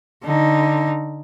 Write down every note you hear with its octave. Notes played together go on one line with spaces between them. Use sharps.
D3 D#4